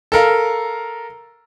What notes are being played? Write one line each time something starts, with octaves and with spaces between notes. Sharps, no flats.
A4 A#4 F5